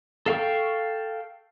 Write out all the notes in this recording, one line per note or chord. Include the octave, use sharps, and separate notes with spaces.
A4 F5 G5 C#6